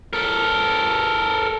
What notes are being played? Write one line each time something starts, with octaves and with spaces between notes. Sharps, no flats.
A4 A#4